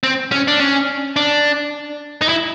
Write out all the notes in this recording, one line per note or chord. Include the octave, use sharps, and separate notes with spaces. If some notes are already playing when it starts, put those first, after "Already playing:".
C4
C#4
D4
C#4
D4
D#4
E4